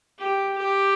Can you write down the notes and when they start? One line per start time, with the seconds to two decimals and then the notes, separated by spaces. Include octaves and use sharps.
0.19 G4
0.58 G4